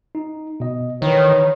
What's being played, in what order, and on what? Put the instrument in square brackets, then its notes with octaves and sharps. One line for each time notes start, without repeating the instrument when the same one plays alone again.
[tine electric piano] D#4
B2 D#5
[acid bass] D#3 [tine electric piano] E3 B4 [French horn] C#5